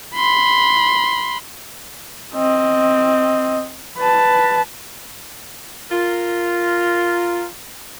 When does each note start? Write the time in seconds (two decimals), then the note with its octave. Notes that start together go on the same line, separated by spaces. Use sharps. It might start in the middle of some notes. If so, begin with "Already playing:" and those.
0.16 B5 C6
2.34 C4 D#5
3.98 B4 A5
5.91 F4 A#4